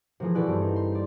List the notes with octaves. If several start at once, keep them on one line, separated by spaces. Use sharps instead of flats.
C3 E3 F3 A3 G#4
B2 E4 A4 D5 G#5 F#6
G2 C4
D#4
C6
C4 D5